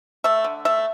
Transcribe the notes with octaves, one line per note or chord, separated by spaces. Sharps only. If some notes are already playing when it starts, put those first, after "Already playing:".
A3 E5
D3
A3 E5